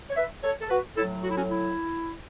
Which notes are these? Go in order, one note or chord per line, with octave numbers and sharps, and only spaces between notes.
C#5
B4 E5
A4 C#5
A4
F#4 B4
A2 F#3 E4 A4
F#4
E4
C#4 F#4
E4